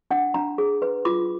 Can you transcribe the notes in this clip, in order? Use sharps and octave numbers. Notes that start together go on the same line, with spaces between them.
D4 F#5
D4 A#5
G#4
B4
F4 D6